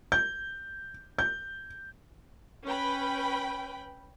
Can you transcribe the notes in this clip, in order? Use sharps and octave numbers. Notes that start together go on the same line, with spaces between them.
G6
G6
C#4 B4 G5 B5